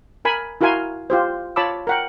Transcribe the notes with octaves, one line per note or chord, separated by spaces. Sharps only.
A#4 G#5 B5
E4 F#4 A#4 F5 G#5 C6
F4 G4 C5
F4 C#5 A5 B5 D6 E6
A#4 F#5 G5